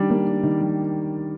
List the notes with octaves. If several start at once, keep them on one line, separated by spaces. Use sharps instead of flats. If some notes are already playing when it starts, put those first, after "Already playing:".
Already playing: D#3 G3 D4
A#3
D4
D#3
G3